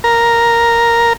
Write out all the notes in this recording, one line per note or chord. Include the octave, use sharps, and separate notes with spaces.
A#4